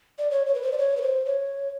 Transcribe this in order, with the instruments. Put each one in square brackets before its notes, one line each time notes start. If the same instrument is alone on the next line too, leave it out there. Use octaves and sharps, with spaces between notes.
[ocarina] D5
C#5
C#5
B4
C5
D5
C#5
B4
C5
C#5